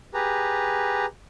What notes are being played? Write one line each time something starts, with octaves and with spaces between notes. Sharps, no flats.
G4 G#4 B4 A#5